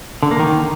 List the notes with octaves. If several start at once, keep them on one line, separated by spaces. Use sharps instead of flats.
D3
A#3
D#3